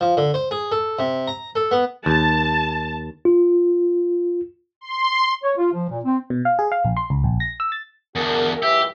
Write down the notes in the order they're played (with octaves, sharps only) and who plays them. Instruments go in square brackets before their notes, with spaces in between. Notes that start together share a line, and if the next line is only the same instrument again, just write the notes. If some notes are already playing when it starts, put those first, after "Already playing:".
[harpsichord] F3
D3
C5
G#4
A4
C3
A#5
A4
B3
[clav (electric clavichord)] D#2 [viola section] A5
[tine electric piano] F4
[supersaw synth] C6
[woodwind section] C#5
F4
F3
A#2
C4
[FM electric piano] B2
F5
G#4
F5
A#1
C6
C#2
A#1
A#6
E6
A6
[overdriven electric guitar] E2 D3 [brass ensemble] F#4 G#4 A#4
[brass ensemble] C#2 F#2 E3 [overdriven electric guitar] G4 [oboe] E5